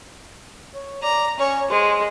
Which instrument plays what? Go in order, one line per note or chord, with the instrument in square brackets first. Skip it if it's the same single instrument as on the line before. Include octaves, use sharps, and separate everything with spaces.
[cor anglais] C#5
[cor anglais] D5 [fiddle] A#5
[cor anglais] C#4 [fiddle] C#5
[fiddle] G#3 [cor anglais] C5